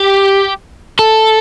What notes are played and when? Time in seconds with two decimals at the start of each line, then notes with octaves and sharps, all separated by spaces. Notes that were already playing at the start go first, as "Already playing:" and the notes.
Already playing: G4
0.99 A4